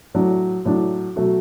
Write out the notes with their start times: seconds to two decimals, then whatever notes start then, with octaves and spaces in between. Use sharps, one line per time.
0.14 A2 F#3 D4
0.65 A2 F#3 D4
1.16 B2 F#3 A3 F#4